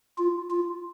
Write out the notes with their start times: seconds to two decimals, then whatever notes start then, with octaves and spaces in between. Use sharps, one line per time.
0.18 F4
0.50 F4